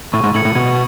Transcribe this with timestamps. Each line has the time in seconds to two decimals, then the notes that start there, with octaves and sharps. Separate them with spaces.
0.13 A2 C#6
0.24 G#2
0.34 A2 G#6 C#7 F#7
0.45 A2
0.55 B2 G#6